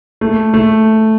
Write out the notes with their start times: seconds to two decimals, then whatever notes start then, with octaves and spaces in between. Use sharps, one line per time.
0.21 A3
0.54 A3